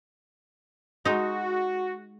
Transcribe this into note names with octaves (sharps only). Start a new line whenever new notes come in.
G#3 D#4 F#4